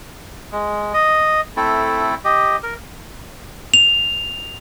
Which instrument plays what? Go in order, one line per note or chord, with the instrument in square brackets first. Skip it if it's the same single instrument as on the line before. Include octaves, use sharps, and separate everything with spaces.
[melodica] G#3
D#5
A3 C4 E4 A4
G4 D#5
A#4
[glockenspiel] F7